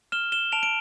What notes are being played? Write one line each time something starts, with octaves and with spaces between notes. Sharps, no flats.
F6 E7 G7
E7 G7
A5 D7 F7
D7